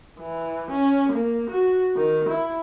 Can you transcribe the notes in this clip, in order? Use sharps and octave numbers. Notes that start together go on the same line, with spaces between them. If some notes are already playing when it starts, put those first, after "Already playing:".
E3
C#4
A#3
F#4
D#3
E4